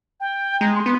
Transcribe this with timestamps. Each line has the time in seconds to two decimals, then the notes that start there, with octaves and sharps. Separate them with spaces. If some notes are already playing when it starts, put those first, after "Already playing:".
0.20 G5
0.61 G#3 A#5
0.73 C6
0.86 B3